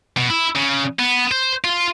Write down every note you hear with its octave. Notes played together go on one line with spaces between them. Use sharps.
B2
E4
C#3
B3
C5
F4